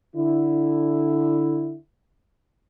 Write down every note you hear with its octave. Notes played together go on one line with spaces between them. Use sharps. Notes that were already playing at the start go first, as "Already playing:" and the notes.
D3 E4